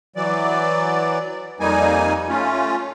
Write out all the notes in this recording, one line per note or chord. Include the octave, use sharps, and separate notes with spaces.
E3 F#3 D5
F2 G3 A#3 D#4 G#5
A3 C#4 F4